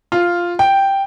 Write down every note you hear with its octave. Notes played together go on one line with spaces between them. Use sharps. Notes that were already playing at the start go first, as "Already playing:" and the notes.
F4
G5